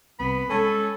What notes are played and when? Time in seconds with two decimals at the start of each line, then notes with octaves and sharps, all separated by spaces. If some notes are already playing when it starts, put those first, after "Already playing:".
0.20 C2 B3 B5
0.50 G#3 C#4 A4